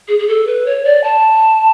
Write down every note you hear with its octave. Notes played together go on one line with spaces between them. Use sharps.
G#4
G#4
A4
B4
C#5
D5
A5